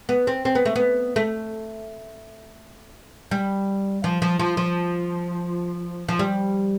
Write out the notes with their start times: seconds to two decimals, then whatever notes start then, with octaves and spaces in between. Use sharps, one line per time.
0.09 B3
0.27 C4
0.45 C4
0.55 B3
0.65 A3
0.76 B3
1.16 A3
3.31 G3
4.04 F3
4.22 F3
4.39 F3
4.57 F3
6.08 F3
6.19 G3